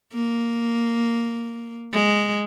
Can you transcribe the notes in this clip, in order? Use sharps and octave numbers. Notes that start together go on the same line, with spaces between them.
A#3
G#3